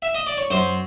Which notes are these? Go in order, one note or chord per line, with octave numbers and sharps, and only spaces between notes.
E5
D#5
D5
C#5
F#2 C5